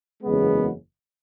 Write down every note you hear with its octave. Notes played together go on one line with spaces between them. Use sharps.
F#1 E2 C#3 G#3 B3